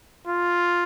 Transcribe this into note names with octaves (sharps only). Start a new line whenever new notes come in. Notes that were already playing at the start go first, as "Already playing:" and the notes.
F4